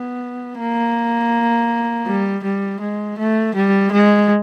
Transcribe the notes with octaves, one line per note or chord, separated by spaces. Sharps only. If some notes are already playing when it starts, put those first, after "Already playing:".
Already playing: B3
A#3
G3
G3
G#3
A3
G3
G#3